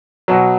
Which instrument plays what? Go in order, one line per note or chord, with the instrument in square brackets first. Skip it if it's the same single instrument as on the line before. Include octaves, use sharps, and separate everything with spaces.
[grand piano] B2 F#3